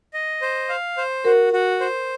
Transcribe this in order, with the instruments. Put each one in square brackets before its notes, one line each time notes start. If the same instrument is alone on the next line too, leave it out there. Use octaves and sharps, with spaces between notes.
[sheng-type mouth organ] D#5
C5
F5
C5
[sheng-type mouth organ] F#4 [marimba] A#4
[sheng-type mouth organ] F#4
C5